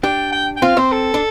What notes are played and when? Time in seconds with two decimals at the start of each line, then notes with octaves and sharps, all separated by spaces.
0.03 D4 G4 G5
0.33 G5
0.57 G5
0.62 C4 F4 F5
0.77 C4 C5
0.92 A4
1.14 D4